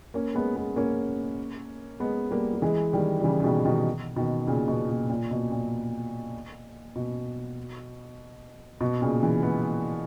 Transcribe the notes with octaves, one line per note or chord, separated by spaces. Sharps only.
A#3 C#4
G#3 B3
G#3 B3
A#3 C#4
G#3 B3
G3 A#3
G3
E3 G#3
D#3 G3
G3
C#3 E3
C#3
B2 D#3
B2 D#3
B2 D#3
A#2 C#3
B2
B2
A#2
B2
A#2
B2
B2
A#2 C#3
C#3 E3
G#3 B3